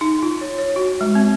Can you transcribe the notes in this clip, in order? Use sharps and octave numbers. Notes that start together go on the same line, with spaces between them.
D#4
F4
C#5
C#5
F#4
G#3
C4